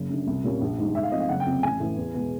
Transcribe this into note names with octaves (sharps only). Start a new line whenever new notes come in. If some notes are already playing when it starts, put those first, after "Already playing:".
Already playing: F#1
F#2 D3
C2
A#2 G3 A#3 C#4
A#1
G#2 D#3 G3
G#2 E5
F5
F3 A3 C4 D#5
F5
F#1 F#5
G5
F2 C3
A1 G#5
A2 E3
E2
B2 G#3